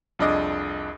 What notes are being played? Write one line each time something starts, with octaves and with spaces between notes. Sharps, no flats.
C2 F2 D4 G#4 D#5 D6